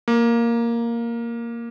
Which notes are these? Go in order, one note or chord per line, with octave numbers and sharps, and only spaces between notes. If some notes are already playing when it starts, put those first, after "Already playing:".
A#3